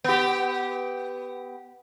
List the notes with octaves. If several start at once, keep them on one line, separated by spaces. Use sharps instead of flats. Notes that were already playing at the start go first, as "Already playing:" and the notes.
B3 G4